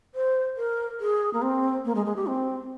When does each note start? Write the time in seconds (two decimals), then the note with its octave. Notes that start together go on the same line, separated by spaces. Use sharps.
0.15 C5
0.57 A#4
1.00 G#4
1.34 A#3
1.42 C4
1.85 A#3
1.95 G#3
2.05 G#3
2.16 G4
2.27 C4